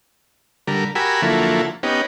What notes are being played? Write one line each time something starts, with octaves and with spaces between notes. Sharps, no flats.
D3 G3 A#4
F#4 G4 A#4 G#5 B5 E6
D3 F3 F#3 A#3 E4 A4
B3 C#4 D#4 G4